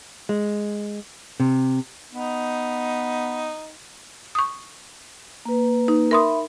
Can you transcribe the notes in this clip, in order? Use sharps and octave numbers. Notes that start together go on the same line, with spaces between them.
G#3
C3
B3 D#4
C#6 D#6
A#3 B4
D#4
A#4 E5 B5 C6 D#6